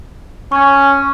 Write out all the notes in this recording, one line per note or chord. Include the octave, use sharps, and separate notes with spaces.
C#4 C#6 G#6